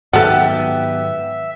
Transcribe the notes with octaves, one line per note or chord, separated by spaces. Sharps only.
G#2 D#3 F#3 B3 F#4 G4 A4 E5